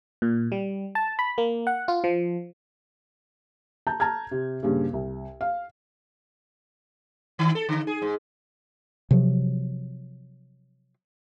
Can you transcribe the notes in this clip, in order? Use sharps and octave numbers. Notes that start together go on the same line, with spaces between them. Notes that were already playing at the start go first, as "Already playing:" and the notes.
A#2
G3
A5
B5
A#3
F#5
F4
F3
A5 A#5 G6
A5 A#5 F6 G#6
C3
G2 A#2 C#3
C2
F5
D#3
A4
D3
G#4
G#2
C3 F3 F#3